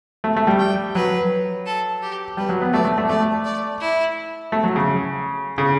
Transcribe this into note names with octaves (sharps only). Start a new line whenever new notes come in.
A3
A3
G3
G5
F#3 B4
A4
G4
G3 B4
F#3
B3
A3 D5
A3
A3
A3 D5
D5
E4
A3
F#3
C#3
C#3